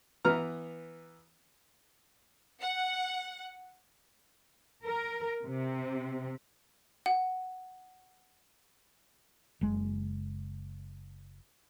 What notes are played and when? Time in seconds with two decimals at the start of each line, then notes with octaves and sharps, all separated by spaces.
0.25 E3 B3 A#5 F6
2.60 F#5
4.83 A#4
5.44 C3
7.06 F#5
9.61 F#1 G#3